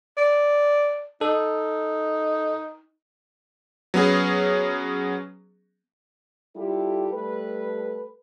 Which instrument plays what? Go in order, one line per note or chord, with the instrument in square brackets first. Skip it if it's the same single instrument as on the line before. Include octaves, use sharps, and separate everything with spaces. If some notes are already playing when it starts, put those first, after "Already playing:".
[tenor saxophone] D5
[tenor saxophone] D#4 [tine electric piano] A4
[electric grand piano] F#3 B3 C#4 G#4
[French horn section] G3 E4 F4 G4 A4
G3 A3 A4 B4